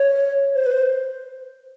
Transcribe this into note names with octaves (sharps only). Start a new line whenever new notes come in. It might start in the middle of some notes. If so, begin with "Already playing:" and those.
Already playing: C#5
C5
B4
C5